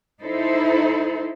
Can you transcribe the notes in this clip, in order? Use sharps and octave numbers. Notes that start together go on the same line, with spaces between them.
D#4 E4 A4 C5